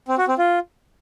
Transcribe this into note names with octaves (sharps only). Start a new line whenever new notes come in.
C4
F#4
C4
F4